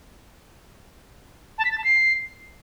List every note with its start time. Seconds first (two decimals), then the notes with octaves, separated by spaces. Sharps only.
1.58 A5
1.65 B6
1.71 A6
1.78 A5
1.84 C7